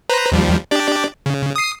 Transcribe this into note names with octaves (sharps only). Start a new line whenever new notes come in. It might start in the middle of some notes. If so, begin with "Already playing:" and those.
B4 C5 A#5
D#2 F3 G3
D4 G4 D5
C#3
D#6 C7